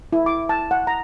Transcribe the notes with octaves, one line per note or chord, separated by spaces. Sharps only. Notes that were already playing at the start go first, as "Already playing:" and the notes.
E4
D6
A5
F#5
A#5